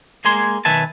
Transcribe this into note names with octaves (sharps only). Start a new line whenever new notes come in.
G#3 A#3 G#4 G#5 C6
B1 D#3 B4 E5 G#5 A5